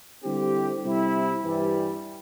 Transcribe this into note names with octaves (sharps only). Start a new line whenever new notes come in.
D3 G3 C4 E4 G4
C3 G3 C4 E4
G2 E3 G3